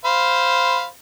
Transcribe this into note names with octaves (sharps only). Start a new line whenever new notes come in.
C5 F5 B5